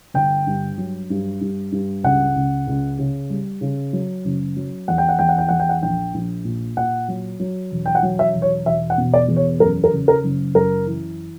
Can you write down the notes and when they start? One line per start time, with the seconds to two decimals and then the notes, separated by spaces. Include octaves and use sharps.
0.14 G1 G5
0.47 G2
0.78 F#3
1.10 G2
1.41 G2
1.72 G2
2.04 C#2 F#5
2.36 C#2
2.67 C#2
2.99 C#3
3.30 G3
3.61 C#3
3.93 F#3
4.25 F#1
4.56 F#3
4.88 E2 F#5
4.98 G5
5.09 F#5
5.19 E2 G5
5.29 F#5
5.38 G5
5.48 E2 F#5
5.60 G5
5.69 F#5
5.82 A#1 G5
6.14 A#1
6.45 A#2
6.77 A#2 F#5
7.08 F#3
7.40 F#3
7.71 E1
7.86 G5
7.95 F#5
8.03 F#3
8.19 E5
8.34 E1
8.42 C#5
8.66 E1 E5
8.90 F#5
8.98 B2
9.14 D5
9.28 E2
9.36 C#5
9.60 F#2 A#4
9.84 A#4
9.92 F#1
10.08 A#4
10.24 F#1
10.55 F#2 A#4
10.86 E3